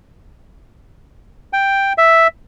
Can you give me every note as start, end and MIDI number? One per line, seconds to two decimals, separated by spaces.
1.53 1.93 79
1.98 2.27 76